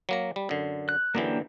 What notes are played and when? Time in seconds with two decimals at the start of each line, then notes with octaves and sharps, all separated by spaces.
0.09 F#3 A#3 A#5
0.36 G3
0.49 F#2 D3
0.89 F#6
1.15 F#2 D3 E3 A#3 D4 G4